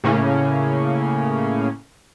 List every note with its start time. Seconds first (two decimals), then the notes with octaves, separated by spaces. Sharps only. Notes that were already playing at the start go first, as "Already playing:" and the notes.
0.04 A2 C#3 A#3 C#4